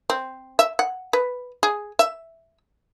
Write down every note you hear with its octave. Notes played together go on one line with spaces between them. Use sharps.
C4
E5
F#5
B4
G#4
E5